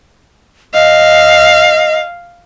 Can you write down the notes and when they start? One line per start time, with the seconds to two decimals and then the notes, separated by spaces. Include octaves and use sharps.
0.74 D#5 F5